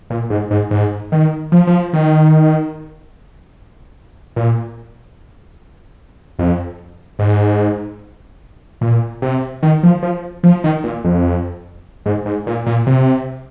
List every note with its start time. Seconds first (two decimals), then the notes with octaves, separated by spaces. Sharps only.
0.10 A#2
0.30 G#2
0.51 G#2
0.71 G#2
1.12 D#3
1.52 F3
1.67 F3
1.93 D#3
4.36 A#2
6.39 F2
7.19 G#2
8.81 A#2
9.22 C3
9.63 D#3
9.83 F3
10.02 F3
10.43 F3
10.64 D#3
10.84 A#2
11.04 F2
12.06 G#2
12.26 G#2
12.47 A#2
12.66 A#2
12.87 C3